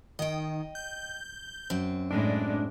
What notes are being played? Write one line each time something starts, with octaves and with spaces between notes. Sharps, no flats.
D#3 D#5 G5
G6
F#2 C4
A2 G#3 D4